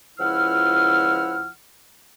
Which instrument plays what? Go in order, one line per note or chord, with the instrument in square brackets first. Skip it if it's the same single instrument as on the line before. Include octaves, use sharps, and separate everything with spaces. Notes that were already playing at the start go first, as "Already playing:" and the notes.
[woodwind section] C#2 F3 E4 F#5 E6 F6